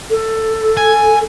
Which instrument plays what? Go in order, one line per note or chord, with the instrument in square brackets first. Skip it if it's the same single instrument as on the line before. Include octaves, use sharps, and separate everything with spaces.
[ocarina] A4
[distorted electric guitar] G#5